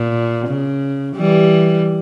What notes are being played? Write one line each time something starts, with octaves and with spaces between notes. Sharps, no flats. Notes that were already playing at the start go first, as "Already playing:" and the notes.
Already playing: A#2
C#3
E3 G3